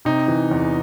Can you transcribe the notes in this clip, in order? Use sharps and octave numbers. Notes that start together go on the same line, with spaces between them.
C3 D#4
E3
E2